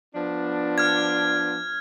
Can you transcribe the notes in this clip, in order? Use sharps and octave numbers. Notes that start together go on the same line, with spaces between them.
F3 B3 D4
F6 G#6